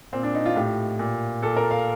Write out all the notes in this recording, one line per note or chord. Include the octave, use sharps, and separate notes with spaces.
A#2 C4
D4
D#4
F4
A2 G4
A#2
A#2 A4
A#4
F5